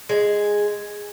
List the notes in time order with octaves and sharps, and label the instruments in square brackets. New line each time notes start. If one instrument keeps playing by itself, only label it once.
[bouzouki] G#3